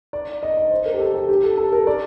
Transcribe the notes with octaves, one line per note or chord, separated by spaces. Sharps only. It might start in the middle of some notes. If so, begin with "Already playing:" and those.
D5
D#5
D#5
C5
A#4
G4
A4
G4
G4
A4
A4
A#4
D5